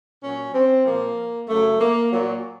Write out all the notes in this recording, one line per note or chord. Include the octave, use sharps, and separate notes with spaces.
A#2 F#3 C#4
C4
A#2 F3 A#3
F#2 C#3 F#3 A3
A#3
A#2 F#3